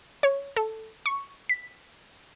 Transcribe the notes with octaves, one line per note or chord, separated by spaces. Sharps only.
C#5
A4
C#6
B6